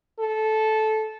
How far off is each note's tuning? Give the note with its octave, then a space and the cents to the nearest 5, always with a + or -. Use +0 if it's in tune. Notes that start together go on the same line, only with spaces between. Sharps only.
A4 -15